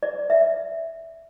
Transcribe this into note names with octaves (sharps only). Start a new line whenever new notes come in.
D5
E5